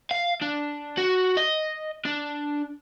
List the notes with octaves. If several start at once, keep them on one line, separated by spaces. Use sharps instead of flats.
F5
D4
F#4
D#5
D4